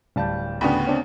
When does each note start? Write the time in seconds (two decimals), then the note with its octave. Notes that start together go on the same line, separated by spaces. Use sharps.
0.16 D1 G3 F5 A5 G6
0.61 D2 C#3 B3 D4 F#5 G5 B5 C#6
0.87 C4 D4 C#5